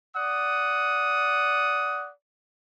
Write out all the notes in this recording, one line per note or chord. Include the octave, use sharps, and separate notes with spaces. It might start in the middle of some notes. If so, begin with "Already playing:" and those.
D5 F#5 D#6